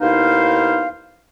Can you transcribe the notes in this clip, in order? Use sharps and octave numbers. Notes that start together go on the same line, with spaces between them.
D#2 B3 D#4 E4 C5 F5